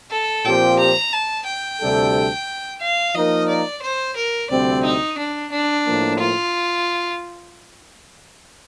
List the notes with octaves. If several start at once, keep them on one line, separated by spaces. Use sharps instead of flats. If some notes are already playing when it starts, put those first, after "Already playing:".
A4
A#2 F3 C4 G4 C5 G5
A#5
A5
G5
D2 C3 G3 D4 A4
F5
F3 A#3 D#4 A#4 D#5
D5
C5
A#4
D2 C3 G3 C4 D5
D#4
D4
D4
A2 F3 A#3
F4